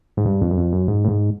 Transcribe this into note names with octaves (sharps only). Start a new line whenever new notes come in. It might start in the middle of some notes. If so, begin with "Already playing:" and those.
G#2
G2
F2
F#2
F2
F#2
G#2
A2
G#2